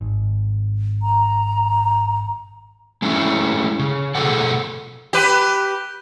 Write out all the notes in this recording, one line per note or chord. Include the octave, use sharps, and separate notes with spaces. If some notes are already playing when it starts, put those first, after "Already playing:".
G#1
A#5
G#3 A3 C#4 E4
C#3
B2 A3 G#4 A4 F#5
G4 B4